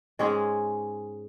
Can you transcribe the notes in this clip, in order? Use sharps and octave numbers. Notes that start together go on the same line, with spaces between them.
G#2 G#3 C#4 G#4